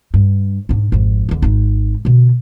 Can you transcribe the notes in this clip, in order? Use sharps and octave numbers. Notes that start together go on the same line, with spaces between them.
G2
G#2 D4
G#1 F2
E2 D3
G#1 D#4
B2 D3